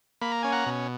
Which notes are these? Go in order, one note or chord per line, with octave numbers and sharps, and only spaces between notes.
A#3 B5
A#5
C#4 G#5
F#5 A#5
B2